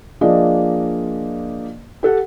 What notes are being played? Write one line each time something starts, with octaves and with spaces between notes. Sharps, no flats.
F3 A#3 D4 G#4 D5 D#5
G4 A4 F#5